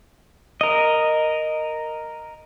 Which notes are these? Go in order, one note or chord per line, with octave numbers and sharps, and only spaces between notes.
A#4 D#5